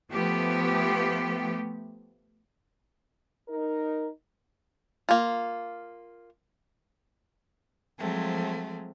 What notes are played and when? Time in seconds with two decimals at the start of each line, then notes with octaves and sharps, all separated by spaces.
0.11 F3 A3 B3 G4
3.48 D#4 A#4
5.09 A#3 F4
7.99 F3 F#3 G#3 A3 C4